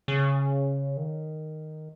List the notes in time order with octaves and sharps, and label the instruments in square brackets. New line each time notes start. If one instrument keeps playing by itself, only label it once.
[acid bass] C#3
D#3